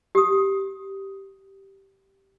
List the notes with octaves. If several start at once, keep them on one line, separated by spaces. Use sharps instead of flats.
G4 D#6